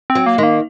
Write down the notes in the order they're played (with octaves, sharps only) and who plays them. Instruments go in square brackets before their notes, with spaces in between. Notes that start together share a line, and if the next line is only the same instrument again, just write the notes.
[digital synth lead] C4
[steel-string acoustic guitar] F#3
[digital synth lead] A#3
[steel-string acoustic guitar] D#3 [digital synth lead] G#3
[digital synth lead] A#3